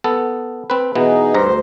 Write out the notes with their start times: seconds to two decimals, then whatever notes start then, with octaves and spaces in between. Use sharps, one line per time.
0.04 B3 A4
0.70 C4 B4
0.95 B2 E3 B3 D#4 G#4
1.34 D2 G2 C5 A#5